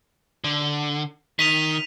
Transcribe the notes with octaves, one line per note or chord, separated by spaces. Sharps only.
D3
D#3 B6 D#7 F7